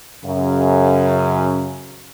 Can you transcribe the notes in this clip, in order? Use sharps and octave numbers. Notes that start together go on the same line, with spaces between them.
F#2 C#3